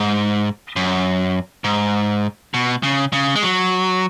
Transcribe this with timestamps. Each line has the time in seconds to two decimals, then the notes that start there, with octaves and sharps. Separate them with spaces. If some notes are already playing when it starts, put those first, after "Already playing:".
Already playing: G#2
0.76 F#2
1.64 G#2
2.54 B2
2.83 C#3
3.13 C#3
3.35 G#3
3.43 F#3